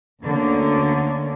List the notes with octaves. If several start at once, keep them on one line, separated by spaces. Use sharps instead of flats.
D2 D3 A#3 C#4